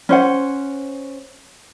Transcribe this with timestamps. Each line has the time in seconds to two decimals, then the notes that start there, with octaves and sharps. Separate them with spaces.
0.09 C#4 C5 F#5